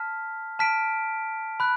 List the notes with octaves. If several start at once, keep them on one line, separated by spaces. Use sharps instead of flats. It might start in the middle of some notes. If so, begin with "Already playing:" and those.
Already playing: A5 F6 B6
A5 F6 B6 D7
B5 F#6